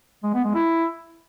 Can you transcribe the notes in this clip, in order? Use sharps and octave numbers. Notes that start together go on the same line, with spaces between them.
G#3
B3
G#3
E4